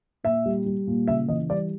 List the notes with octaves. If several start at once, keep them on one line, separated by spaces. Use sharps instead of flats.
A#2 E5
G3
G3
A#2
C#3 E5
E3 D#5
G3 D5